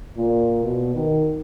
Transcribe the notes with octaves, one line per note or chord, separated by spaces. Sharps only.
A#2
B2
D#3